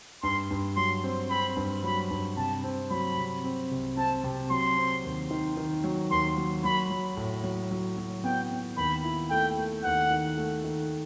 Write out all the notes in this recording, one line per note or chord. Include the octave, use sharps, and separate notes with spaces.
G2 C6
G2
F#3 C6
C4
C4 B5
G2
F#3 B5
G2
C3 A5
C4
F#3 B5
C3
C4
C2
C4 A5
C3
F#3 C6
C4
D#2
D#3
D#3
F#3
D#2 C6
F#3
F#3 B5
F#3
A2
F#3
F#3
F#3
B3 G5
B3
D#2 B5
E4
A3 G5
A3
D#2 F#5
D#3
A3
D#3